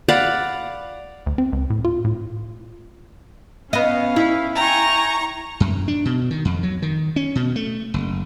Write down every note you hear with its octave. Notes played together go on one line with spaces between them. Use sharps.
D5 F5 F#5 B5
D2
C4
C#2
A2
F4
A2
B3 C#4 D#5 F5
E4
G5 G#5 A#5 C#6
F#2
D4
B2
D#3
F2
F#3
D#3
C#4
B2
A3
F#1